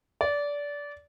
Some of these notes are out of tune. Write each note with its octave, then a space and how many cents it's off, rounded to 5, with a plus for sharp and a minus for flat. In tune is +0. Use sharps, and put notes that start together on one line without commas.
D5 -20